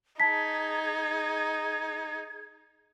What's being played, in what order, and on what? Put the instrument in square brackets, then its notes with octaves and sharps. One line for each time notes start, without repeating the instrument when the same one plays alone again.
[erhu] D#4 [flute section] G#4 G#6 [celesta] A5 B6